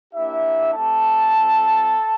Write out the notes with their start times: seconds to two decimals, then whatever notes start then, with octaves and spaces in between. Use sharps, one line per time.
0.14 A#3 D4 E4 G4 E5
0.74 A3 C4 G4 A4 A5
1.34 G3 C4 F4